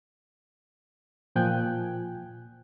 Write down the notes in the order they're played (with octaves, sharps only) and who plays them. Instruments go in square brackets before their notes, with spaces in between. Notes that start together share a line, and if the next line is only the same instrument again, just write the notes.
[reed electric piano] A#2 F3 G5 G#5 F#6 G6